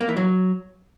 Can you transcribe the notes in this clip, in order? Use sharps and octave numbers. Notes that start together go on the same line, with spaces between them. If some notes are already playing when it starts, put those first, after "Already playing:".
A#3
E3
F#3